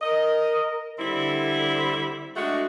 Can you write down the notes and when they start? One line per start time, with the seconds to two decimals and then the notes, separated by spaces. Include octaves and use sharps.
0.02 A#4 D#5
0.99 D3 G3 C4 E4
2.36 G#3 A3 D4 F#4